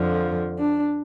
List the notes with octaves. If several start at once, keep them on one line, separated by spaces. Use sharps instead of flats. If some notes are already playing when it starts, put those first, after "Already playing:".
Already playing: F2 D3 F3
D4